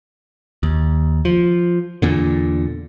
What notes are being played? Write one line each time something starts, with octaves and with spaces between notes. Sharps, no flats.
D#2
F3
E2 A#2 D3